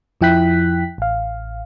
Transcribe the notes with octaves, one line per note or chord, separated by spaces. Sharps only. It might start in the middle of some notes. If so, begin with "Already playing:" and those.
F2 F3 E4 G5 F#6 B6
A1 F5